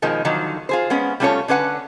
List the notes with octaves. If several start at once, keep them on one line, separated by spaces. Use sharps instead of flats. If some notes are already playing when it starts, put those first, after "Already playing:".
B2 D#3 F3 G#3
D3 D#3 F3 F#3
F4 G#4 C5
G#3 B3 C#4
G3 A3 C#4 F4 A4 C#5
D3 C#4 B4 F#5